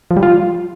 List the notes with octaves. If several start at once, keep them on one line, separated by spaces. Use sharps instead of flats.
F3
G3
F4